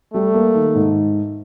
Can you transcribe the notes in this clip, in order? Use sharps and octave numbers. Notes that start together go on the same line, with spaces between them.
G3 A3
A#3
D#3
G#2